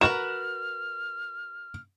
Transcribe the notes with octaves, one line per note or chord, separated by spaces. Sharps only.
F#4 A#4 B4 F6 E7